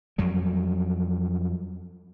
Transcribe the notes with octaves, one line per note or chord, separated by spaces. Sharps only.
F2 F#3 G3